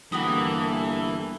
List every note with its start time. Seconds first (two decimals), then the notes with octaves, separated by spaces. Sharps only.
0.12 G1 E3 A#3 F#4 G4 A4 D#6